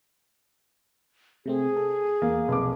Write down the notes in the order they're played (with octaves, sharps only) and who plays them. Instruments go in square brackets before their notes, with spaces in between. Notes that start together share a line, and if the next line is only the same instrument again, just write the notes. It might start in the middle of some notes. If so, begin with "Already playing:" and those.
[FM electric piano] C3 A3 C4 [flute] G#4
[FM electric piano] A4
[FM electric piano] E2 [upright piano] A#3
[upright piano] F1 D6 [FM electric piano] B1